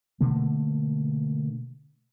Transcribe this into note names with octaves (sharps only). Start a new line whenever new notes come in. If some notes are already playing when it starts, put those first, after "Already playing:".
B2 D3 A3 A#3